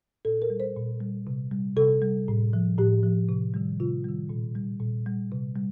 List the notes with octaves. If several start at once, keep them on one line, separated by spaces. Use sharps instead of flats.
A#2 A4
A#4
G3
C5
A#2
G3
C3
G3
C3 A4
G3
A2
F3
A2 G4
F3
C3
D#3 G3
C3 F4
D#3 G3
A#2
G3
A#2
G3
C3
G3